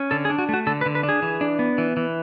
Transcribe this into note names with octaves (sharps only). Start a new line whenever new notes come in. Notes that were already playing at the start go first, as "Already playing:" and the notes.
Already playing: C#4
D3 A4
G#4
D4
F#4
A3 F#4
D3 A4
B4
D3
B4
D4
G#4
E3
D4
B3
E3
E3